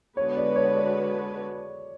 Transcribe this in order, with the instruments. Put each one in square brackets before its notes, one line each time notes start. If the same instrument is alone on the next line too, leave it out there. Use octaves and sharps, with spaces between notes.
[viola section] D3 G#3 B3 F#4 B4 [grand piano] C#5
[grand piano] D5
C#5
D5